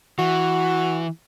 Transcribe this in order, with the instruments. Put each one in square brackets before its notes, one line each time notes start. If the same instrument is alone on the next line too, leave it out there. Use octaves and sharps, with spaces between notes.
[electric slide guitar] E3 [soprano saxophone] F#4